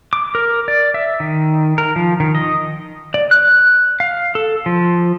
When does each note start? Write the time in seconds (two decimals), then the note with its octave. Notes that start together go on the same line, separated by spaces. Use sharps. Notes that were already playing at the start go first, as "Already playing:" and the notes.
0.13 D6
0.35 A#4
0.68 D5
0.94 E5
1.20 D#3
1.78 A#4
1.96 F3
2.20 D#3
2.35 D#5
3.14 D5
3.31 F#6
4.00 F5
4.35 A4
4.66 F3